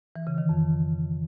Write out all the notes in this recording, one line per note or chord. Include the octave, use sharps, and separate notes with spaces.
E3
C#3
D#3
F2